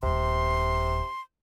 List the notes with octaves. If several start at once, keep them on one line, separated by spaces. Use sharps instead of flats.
D#1 G#1 C3 C6